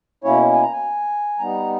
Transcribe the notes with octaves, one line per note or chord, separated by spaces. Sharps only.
B2 A#3 C#4 E4 C#5
G#5
A#5
G#5
G3 B3 D#4 A#5